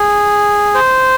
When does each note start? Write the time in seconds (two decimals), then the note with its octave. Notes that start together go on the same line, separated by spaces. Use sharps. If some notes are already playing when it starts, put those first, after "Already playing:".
Already playing: G#4
0.74 C5